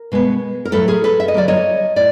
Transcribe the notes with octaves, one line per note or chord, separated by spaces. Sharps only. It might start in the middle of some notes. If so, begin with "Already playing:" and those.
Already playing: A#4
B2 G#3 B3
A#4
A2 F#3 A3 A4 B4
G#4 A#4
A4 B4
E5
D#5
D3 F#3 A#3 D5
C#5 D#5
A2 D5